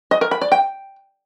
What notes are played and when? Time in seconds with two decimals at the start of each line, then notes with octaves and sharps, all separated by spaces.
0.11 D#5
0.21 A#4
0.31 B5
0.41 D5
0.52 G5